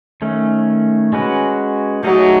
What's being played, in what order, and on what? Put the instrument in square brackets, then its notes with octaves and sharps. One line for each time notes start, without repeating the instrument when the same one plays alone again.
[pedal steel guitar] D#3 A3 C#4
G#3 C#4 F#4 B4
[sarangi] F#3 [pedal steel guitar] A3 D#4 G#4 D#5